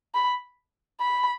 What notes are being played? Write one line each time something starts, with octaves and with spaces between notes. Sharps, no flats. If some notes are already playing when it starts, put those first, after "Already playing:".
B5
B5